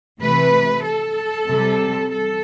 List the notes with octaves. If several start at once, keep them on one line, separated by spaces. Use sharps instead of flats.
C3 E3 A3 B4
A4
C3 G3
A4